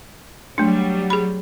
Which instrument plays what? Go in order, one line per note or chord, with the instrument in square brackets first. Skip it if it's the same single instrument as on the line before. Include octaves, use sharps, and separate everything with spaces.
[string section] F#3 G3 [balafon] A3 D4
[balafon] G#4 B5